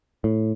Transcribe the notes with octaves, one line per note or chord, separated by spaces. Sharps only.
A2